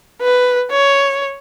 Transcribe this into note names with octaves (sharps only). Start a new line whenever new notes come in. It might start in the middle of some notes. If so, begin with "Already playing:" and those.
B4
C#5